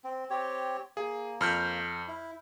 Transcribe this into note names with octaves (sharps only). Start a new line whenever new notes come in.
C4
C4 G4 C#5
A#3 G#4
F2 F6 G6
E4